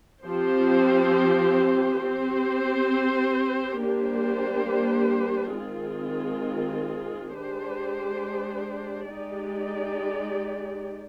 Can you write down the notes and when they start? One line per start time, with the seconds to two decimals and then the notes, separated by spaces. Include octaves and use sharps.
0.25 F3 C4 G4 C5
2.03 C4 G4 C5
3.81 G3 A#3 D4 G4 C5
5.58 D#3 G#3 C4 F4 G#4
7.36 G#3 D4 G4 C5
9.14 G#3 D#4 G4 D5